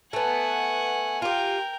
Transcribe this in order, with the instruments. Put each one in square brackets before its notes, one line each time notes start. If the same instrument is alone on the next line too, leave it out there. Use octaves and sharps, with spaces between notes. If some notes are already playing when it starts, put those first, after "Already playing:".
[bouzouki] A3 B3 [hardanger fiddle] F#5 G#5
[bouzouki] F4 G4 [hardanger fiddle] A#4 G5